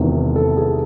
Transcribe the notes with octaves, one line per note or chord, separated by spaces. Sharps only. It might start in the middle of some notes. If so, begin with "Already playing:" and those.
Already playing: E1 E2 C3 D#3
A4
G#4